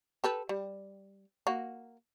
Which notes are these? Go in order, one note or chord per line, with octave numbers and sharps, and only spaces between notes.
G4 A4 B4
G3
A#3 F#4